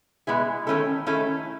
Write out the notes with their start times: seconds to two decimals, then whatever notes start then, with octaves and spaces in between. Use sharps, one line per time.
0.27 B2 G#3 B3 E4 G#4
0.67 D#3 A3 C#4 E4 A4
1.06 D#3 A3 C#4 E4 A4